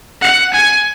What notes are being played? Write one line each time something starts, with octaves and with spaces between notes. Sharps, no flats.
F#5
G#5